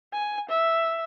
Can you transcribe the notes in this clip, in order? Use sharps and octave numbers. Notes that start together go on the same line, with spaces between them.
G#5
E5